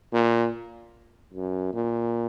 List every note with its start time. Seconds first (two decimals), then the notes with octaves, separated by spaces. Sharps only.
0.13 A#2
1.34 F#2
1.74 A#2